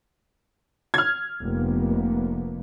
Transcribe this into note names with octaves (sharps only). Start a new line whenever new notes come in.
F6 G#6
F1 A#3 B3